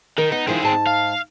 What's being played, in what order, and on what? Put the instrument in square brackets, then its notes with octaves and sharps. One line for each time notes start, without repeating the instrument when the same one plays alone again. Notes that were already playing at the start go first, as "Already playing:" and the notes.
[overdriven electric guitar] D#3 [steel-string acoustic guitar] A#4
[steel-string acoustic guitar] B3 [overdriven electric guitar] D#4
[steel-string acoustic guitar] D#3 F3 E4 [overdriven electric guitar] C4 G#4
[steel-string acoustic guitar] G#2 A5
[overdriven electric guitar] F5